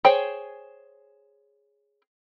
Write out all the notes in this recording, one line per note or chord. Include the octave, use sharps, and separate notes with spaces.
G#4 C5 C#5 G5